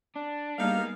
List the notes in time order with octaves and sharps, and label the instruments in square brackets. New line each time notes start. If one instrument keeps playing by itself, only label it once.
[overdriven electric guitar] D4
[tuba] G3 [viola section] A#3 B3 G#4 [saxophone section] D#4 G4 F5